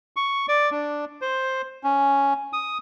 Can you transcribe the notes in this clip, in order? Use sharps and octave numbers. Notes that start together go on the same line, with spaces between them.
C#6
D5
D4
C5
C#4
D#6